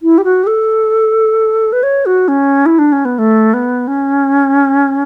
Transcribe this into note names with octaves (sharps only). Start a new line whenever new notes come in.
E4
G4
F#4
G4
A4
B4
C#5
F#4
C#4
E4
D4
C#4
B3
A3
B3
C#4